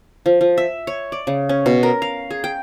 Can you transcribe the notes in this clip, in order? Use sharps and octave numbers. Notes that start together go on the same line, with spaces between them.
F3
F3
E5
C#5
D5
C#3
C#4
B2
A#4
F5
G#4
G5